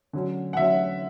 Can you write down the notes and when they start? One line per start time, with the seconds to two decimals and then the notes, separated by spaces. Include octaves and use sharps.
0.13 D3 F#3 C#4
0.53 F#5
0.57 D3 F#3 C#4 E5